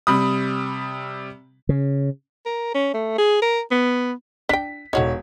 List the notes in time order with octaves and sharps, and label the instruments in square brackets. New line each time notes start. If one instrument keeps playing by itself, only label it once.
[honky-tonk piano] C3 G3 B5 D#6
[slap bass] C#3
[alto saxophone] A#4
C#4
A3
G#4
A#4
B3
[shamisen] D4 G5 [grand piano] B6
[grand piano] E1 C#5 [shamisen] D#4 F#4 A4